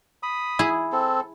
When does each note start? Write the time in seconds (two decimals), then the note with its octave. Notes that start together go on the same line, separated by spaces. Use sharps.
0.23 B5 D#6
0.59 E4 G#4
0.92 C4 A4